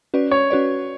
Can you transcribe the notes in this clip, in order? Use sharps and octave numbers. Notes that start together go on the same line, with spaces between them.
C#4 F#4 B4 D5
C#5
C#4 F#4 B4 D5